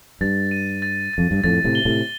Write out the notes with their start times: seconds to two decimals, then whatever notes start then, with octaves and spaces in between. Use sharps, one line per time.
0.21 G2 A6
0.51 D#7
0.82 A6
1.13 F2 A6
1.31 G2
1.44 F2 A2 A6
1.64 A2 C3
1.75 G7
1.85 A2 C3